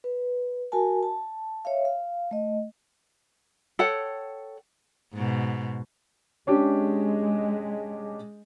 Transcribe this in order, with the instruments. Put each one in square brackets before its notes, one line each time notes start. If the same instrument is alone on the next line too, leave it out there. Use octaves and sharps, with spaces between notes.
[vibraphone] B4
F#4 A#4 G#5 A5
A5
C#5 E5 F5
F5
A3 D#5
[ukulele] A4 C#5 F#5 G5
[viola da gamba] G#2 B2
[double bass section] G#3 [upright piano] C#4 D4 G4